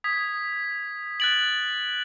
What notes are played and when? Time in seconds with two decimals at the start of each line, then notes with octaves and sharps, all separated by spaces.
0.04 D#6 G#6 B6
1.20 F#6 A6 D7 F#7